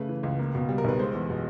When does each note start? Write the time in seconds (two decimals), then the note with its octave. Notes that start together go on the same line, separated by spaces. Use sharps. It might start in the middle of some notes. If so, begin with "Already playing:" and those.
Already playing: C#3 A3 B4
0.09 E3
0.23 C#2
0.39 A#3
0.55 B2
0.69 G3
0.78 A#4
0.84 B1 B4
0.99 G#3 C5
1.14 E2
1.30 B2